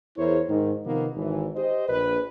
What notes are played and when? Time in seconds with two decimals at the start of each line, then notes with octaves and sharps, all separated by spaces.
0.17 E2 E4 G#4 A#4 C5 C#5
0.48 G#2 D#3
0.85 C3 D#3 F3 A#3 B3
1.16 G#1 E3
1.56 G4 C5 D#5
1.89 A#1 B4